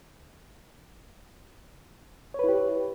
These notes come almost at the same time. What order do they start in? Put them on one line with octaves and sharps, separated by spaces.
C#5 B4 E4 G4